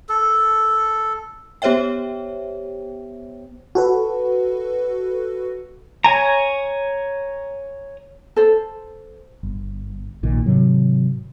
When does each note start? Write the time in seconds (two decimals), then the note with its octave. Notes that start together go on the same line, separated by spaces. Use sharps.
0.09 A4
1.62 B3 G4 C5 C#5 E5 G5
3.75 F#4 A4 B4
6.04 C#5 G#5 A#5
8.36 A4 C5
9.43 G1
10.23 A#1 A#2 D#3
10.46 G#2 C3 D#3 F#3